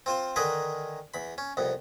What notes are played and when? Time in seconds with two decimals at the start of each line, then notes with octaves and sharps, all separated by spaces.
0.06 C4 F4 C5
0.36 D3 D#3 D#4 G#4 A#4 B4
1.14 E2 B5
1.38 C#4
1.57 C2 F2 B3